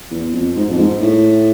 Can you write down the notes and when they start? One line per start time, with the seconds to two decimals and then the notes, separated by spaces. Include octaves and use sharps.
0.11 E2
0.33 F2
0.56 G#2
0.70 F2
0.79 G#2
1.01 A2